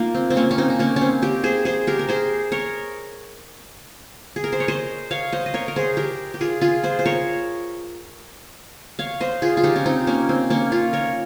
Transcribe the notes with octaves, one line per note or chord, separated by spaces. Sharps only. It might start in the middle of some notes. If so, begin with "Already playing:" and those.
Already playing: A#3 D#4 F4
C4
C4
A#3 C#4
C#4
C4 D#4
D#4
A#3 C#4
C#4
C4
G4 A#4
G#4 C5
G#4 C5
G4 A#4
A#4
G#4 C5
A#4 C#5
G#4
A#4
C5
C#5
C5 D#5
C#5 F5
C5 D#5
D#5
A#4 C#5
A#4
G#4 C5
G4 A#4
G4
F4 G#4
F4 G#4
G#4 C5
C5
A#4 C#5
C#5 F5
C5 D#5
F4 G#4
F4
D#4 G4
C#4
C4 D#4
A#3 C#4
C4
A#3 C#4
C#4 F4
A#4 C#5